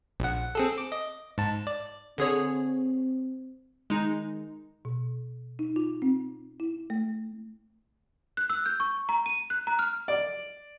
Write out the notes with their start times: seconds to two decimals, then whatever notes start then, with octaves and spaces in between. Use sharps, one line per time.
0.20 A#1 F#5
0.55 C4 G#4 A4
0.78 D6
0.92 D#5
1.38 G#2 A5
1.67 D5
2.18 D3 C4 G#4 C#5
3.90 D#3 G#3 D#4
4.85 B2
5.59 D#4
5.76 F4
6.02 C4
6.60 E4
6.90 A3
8.37 F#6
8.50 E6
8.66 G6
8.80 C#6
9.09 A#5
9.26 D#7
9.50 F#6
9.67 A#5
9.79 F6
10.08 D5